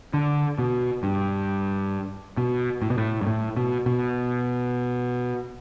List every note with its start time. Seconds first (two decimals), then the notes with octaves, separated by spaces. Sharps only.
0.14 D3
0.58 B2
1.03 G2
2.37 B2
2.82 A2
2.90 B2
2.98 A2
3.21 G2
3.27 A2
3.56 B2
3.86 B2